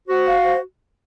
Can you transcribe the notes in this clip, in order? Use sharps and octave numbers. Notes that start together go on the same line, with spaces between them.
F#4 C5
F5
C5